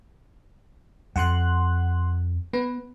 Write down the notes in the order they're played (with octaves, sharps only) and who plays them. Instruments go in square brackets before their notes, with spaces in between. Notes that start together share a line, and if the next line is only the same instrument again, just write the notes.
[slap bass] F2 [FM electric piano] F#5 C6 F#6
[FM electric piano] B3 B4